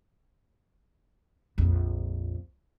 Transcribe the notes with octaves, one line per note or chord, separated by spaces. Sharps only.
A#1 F2